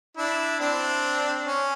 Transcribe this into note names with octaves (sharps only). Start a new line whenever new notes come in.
D4 E4
C4 D4
C#4